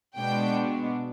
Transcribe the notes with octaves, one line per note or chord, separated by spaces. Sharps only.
B2 G#3 B3 D4 G5